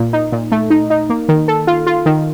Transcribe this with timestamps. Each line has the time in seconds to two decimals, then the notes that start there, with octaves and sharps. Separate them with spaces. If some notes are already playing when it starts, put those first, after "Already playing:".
Already playing: A#2
0.13 D#4
0.32 A#2
0.52 A3
0.70 D#4
0.90 D#4
1.10 A#3
1.29 D#3
1.48 A4
1.67 F4
1.87 F4
2.06 D#3